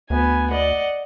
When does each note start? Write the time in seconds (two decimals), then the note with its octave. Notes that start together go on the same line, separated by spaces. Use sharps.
0.10 D2 B3 G#5
0.51 D5 D#5 F#5